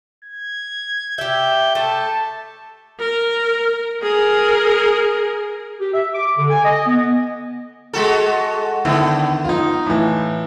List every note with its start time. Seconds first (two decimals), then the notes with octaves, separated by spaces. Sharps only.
0.25 G#6
1.18 G4 E5 G6
1.75 A3 A5
2.99 A#4
4.02 G#4 A#4
5.80 G4
5.94 E5
6.13 D6
6.37 D3
6.50 G#5
6.64 D#5
6.86 B3
7.93 G#3 F#4 A4
8.85 D3 D#3 B3 E4
9.45 D#4 F4
9.86 A2 E3